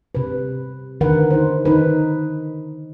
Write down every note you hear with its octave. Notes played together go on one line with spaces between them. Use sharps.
C3 B4
D3 D#3 A#4 B4 F#5
D#4 C5
D#3 D#4 B4